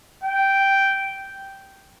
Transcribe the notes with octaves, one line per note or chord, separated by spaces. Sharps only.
G5